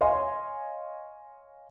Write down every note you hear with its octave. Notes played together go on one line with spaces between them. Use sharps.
C#5 D#5 F5 G#5 C6